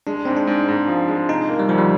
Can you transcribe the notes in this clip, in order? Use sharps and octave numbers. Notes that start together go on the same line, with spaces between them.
G#3 D4
G#2 C4
D4
G#2
G#2
F3
G#3
C3 D#4
A#3
G3
D2 F3
G3